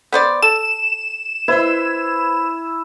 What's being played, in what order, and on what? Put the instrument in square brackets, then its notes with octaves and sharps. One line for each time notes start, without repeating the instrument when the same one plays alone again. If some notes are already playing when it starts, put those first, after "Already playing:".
[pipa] B3 C5 D5
[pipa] A4 [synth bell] E7
[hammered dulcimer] E4 [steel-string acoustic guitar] B4 C5 E5